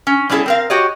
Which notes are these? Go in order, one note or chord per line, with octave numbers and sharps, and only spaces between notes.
C#4
G3 B3 C#4 E4 G#4 A4
C4 A#4 F5
F#4 G4 C#5 D#5